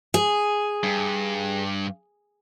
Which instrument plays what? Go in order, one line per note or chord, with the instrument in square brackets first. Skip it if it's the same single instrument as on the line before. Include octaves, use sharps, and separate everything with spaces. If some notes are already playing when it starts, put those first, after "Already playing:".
[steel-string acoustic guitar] G#4
[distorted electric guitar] G2